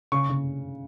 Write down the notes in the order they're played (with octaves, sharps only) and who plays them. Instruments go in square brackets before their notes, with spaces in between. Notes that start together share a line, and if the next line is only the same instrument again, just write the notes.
[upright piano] C#3 [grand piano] C#6
[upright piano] C#3